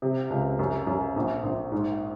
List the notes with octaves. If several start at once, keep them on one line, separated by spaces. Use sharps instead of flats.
C3
C#2
F#2
F#2
A#1
A#1
G#2